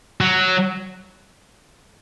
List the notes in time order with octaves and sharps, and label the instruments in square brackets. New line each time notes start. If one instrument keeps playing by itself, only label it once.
[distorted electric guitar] F#3